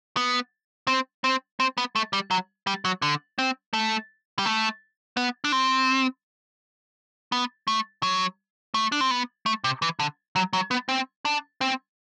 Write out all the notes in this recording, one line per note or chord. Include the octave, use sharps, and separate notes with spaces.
B3
C4
C4
C4
B3
A3
G3
F#3
G3
F#3
D3
C4
A3
G3
A3
B3
D4
C4
B3
A3
F#3
A3
D4
C4
B3
A3
C3
E3
D3
F#3
F#3
B3
C4
D4
C4